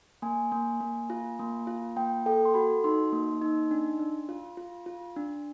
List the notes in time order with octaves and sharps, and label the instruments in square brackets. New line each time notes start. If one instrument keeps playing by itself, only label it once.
[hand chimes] A#3 G#5
A#3
A#3
F4
A#3
F4
A#3 G5
A4 G5
C6
F#4 B5
D#4 C6
A#3
D#4
D4
D4
F4
F4
F4
D4